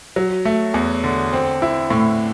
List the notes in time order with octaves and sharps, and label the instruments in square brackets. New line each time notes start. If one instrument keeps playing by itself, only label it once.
[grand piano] F#3
A3
E2
D3
C4
E4
A2